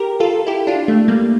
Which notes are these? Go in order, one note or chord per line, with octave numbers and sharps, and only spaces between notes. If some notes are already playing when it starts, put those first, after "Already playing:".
Already playing: G4 A#4
F4 A4
E4 G4
D4 F4
A3
G3 A#3